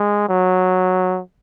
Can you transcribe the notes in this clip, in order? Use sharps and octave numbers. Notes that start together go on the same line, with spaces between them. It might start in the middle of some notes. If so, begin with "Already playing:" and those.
Already playing: G#3
F#3